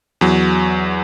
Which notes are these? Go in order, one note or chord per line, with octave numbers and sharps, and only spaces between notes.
E2 F#3